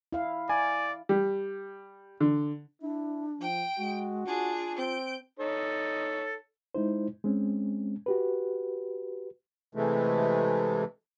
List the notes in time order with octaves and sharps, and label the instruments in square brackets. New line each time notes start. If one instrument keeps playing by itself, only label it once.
[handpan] E4 F5
[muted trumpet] D5 [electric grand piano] G#5
[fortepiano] G3
D3
[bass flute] D4 [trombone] E4
[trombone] F3 [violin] G5 D7
[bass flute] G#3 [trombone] F#4
[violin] D4 G#4 [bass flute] F4
[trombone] C4 [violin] G6 D7
[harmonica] D#4 A4 C#5
[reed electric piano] G#3 D#4 E4 C5
G#3 C4 C#4
F#4 G4 B4
[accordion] C3 E3 G#3 A3